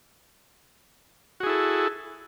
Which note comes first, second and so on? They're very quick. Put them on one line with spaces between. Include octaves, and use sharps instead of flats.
F#4 G#4 E4 A4